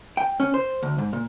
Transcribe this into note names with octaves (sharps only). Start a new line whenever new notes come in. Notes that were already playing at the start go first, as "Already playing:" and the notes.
G5
C#4
C5
D2
G#2
A#2